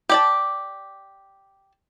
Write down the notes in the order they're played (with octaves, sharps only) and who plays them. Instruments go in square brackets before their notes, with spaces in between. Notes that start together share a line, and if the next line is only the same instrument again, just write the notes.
[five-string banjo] G4 D5 A5